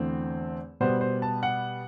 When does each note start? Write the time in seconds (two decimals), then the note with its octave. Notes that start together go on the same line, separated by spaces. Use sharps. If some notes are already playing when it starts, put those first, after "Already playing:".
Already playing: E2 D3 A3 C4
0.80 B2 G3 B3 C5
1.01 C5
1.22 A5
1.43 F#5